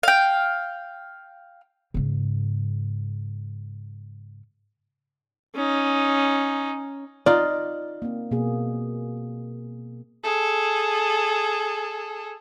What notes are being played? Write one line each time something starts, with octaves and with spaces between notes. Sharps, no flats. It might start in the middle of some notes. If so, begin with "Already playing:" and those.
F5 G5
G#2 C#3
C#4 D#4
D#4 F4 D5
A#3 C4
B2 A#3 G#4
G#4 A4